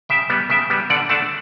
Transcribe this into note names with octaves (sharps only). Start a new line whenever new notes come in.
C#3 E5 G5
G3 B3
C#3 E5 G5
G3 B3
D3 D5 F#5
A3 D4 F#5 A5